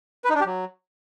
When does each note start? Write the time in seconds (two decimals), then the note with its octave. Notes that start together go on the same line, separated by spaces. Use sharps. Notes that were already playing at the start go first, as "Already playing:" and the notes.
0.24 B4
0.30 D#4
0.35 D4
0.40 G4
0.46 F#3